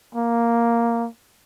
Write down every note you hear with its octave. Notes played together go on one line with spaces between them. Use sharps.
A#3